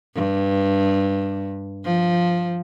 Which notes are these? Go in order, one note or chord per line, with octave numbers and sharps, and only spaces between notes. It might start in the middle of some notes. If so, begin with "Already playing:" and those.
G2
F3